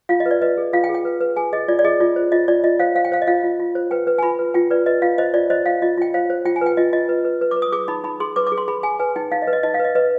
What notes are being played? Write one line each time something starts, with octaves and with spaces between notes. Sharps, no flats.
F4 F5
D#5
B4
D5
B4 D#5
G#4
F4 F5
G5
G#4
G5
B4
B4
G#4 G#5
G#4 D#5
F4 D5
D5
G#4 D#5
F4 D5
C5
F4 D#5
F4 D5
F4 D#5
C5 F5
C5 F5
G5
C5 F5
D#5
F4 F5
F4
F4
C5
B4 G5
B4
G#5
F4 B5
B4
F4 G5
B4 D5
B4 D#5
F4 F5
C5 D#5
F4 D5
C5 D#5
F4 F5
F4 D#5
F4 G5
C5 F5
C5
F4 G5
G#5
B4 G5
F4 D#5
F4 D#5
B4
B4
B4
D6
B4
D#6
G#4 D6
D#4 B5
D#4 B5
G#4 C6
B4 D6
D6
G#4
C6
G#4 B5
G#4 G#5
B4 G#5
D#4 G5
D#4 F5
D#5
B4
D#5
D#4 D#5
F5
B4
D#5
B4 D#5